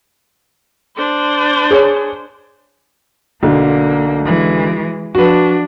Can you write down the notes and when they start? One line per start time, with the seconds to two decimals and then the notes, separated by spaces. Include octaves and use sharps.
0.97 D4 C5
1.71 G#4 C#5
3.43 B1 D3 A#3
4.25 E3 G#3
5.15 F3 D4 F#4 B4